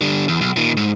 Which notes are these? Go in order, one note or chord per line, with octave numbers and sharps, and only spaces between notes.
D3 G3
E2
B1
A#2 D#3
G#2